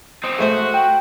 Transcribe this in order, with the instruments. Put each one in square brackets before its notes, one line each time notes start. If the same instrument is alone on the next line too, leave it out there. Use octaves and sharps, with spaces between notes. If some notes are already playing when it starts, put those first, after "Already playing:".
[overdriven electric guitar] C4 D#4
[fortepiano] G#3 A3 C5 [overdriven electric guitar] F#4
[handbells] G5